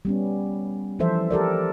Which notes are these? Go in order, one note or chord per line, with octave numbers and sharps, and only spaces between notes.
G3 B3 C#4
E3 F3 A4 C5 E5
G4 A4 A#4 D5